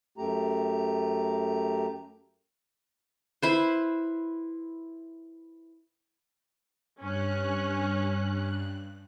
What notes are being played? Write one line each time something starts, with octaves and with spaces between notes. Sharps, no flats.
F#2 A3 G4 A#5
E4 B4 C5
G2 C#4 F#6